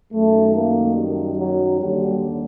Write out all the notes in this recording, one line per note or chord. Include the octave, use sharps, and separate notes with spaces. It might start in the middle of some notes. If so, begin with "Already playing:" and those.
F#2 D#3 A3
A#3
G3
F#3
D#2 D3 G3